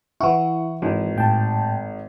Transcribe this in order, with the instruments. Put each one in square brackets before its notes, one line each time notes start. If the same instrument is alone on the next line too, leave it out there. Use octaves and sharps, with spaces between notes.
[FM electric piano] E3 E4 [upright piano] F#5 C#6
[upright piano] G#1 [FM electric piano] E3
[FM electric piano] A2 G5 A5